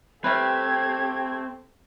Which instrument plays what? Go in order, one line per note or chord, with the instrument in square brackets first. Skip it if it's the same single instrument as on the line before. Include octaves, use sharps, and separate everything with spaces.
[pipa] G3 A3 B4 [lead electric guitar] C4 [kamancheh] G4 A4 [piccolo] G#6